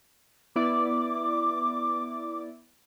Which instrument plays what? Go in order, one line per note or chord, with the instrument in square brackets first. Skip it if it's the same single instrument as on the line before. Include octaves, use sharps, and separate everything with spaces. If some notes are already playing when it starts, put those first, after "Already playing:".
[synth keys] B3 E4 D5 [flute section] D6